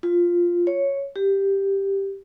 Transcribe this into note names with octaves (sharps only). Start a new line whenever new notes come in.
F4
C#5
G4